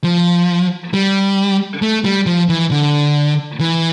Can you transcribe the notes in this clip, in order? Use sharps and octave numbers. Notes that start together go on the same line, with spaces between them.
F3
G3
A3
G3
F3
E3
D3
E3